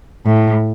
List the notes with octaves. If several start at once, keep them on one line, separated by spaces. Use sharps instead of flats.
A2